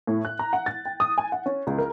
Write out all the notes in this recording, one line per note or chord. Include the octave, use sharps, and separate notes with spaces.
A2
F#6
A#5
F#5
A6
G5
D#6
G#5
F#5
C#4
C#2
A#4